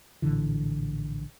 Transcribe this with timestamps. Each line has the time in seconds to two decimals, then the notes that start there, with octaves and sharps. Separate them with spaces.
0.22 A#1 A2 D3 E3